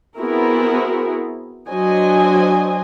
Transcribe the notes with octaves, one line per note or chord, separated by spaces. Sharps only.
B3 C4 E4 F#4 G#4 A#4
F#3 D4 C5 D#5 G#5